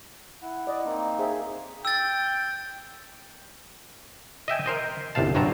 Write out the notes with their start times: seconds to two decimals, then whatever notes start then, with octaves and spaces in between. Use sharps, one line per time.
0.42 E4 F#5
0.67 D5 D#5
0.85 A#3 C4 D#4
1.19 G#4 C5 E5
1.85 G5 E6 A6
4.48 D#5 E5 G5 G#5
4.66 A#4 C5 D#5
5.15 G1 C2 C3 F5 A5
5.35 G1 G2 F#3 C4 A5 A#5